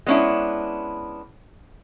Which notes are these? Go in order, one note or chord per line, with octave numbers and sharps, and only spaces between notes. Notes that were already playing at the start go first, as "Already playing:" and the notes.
G#3 B3 C#4 D4 E4